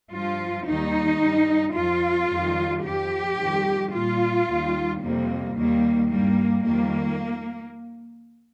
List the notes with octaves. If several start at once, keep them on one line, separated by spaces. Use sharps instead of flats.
G2 F3 F4
D#2 D#3 G3 D#4
G2 G3
F2 F3 F4
F2 D#3 G3
F2 F3 G4
F2 D#3 G3
A#2 G3 F4
D#2 D#3 G3
F2 C3 G3 A#3
D#2 D#3 G3 A#3
G2 G3 A#3
F2 D#3 G3 A#3